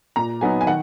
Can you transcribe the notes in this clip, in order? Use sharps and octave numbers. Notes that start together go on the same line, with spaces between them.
A#2 A#5
F#3 B3 D#4 G#5
G#5
D#3 F#5